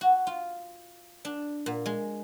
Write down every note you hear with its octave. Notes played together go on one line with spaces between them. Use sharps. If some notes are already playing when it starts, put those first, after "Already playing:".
F#4
F4
D4
A#2
G#3